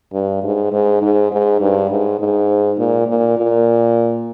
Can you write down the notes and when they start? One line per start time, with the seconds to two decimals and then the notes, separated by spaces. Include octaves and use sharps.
0.13 G2
0.43 G#2
0.73 G#2
1.02 G#2
1.32 G#2
1.61 G2
1.90 G#2
2.20 G#2
2.78 A#2
3.07 A#2
3.37 A#2